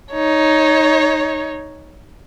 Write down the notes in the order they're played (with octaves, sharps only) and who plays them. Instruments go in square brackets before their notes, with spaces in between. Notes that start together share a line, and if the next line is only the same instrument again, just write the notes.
[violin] D#4 C#5